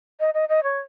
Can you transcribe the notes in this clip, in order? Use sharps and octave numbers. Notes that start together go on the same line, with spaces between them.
D#5
D#5
D#5
C#5